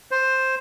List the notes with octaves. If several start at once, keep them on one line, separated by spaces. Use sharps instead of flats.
C5